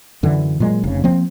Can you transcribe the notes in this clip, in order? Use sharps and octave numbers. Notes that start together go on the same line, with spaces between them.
F#2 D3 E3
A#2 F#3 G#3
F1 C#3
F3 A#3 C4